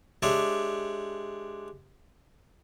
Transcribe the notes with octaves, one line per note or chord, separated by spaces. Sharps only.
G#3 D4 G4 C#5 E5